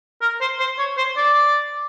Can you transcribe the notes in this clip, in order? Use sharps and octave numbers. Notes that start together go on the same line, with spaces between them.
A#4
C5
C5
C#5
C5
D5